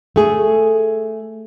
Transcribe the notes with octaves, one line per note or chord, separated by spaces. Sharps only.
A3 G#4